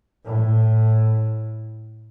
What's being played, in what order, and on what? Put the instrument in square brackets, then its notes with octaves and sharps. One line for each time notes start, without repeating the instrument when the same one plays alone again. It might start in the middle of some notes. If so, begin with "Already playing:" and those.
[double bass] A2